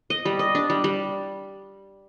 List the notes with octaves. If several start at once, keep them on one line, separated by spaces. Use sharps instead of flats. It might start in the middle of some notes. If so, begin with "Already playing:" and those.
D#5
G3
D#5
D4
G3
G3